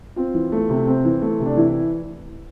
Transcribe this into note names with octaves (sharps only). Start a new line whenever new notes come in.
C4 F4
E3
A3
C3
C4
E3
A3
C3
D4
E3 E4